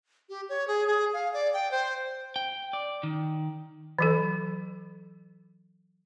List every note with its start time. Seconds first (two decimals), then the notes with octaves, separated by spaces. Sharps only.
0.29 G4
0.49 C#5
0.68 G#4
0.87 G#4
1.13 F5
1.33 D5
1.53 G5
1.71 C5
2.36 G5
2.73 D5
3.03 D#3
3.99 E3 F#3 A4